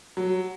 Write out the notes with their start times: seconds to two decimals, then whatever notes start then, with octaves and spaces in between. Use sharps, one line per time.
0.17 F#3